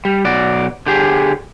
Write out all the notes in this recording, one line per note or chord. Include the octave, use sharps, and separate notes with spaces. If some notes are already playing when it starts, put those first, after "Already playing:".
G3
B1 F#4 D5
D3 G4 G#4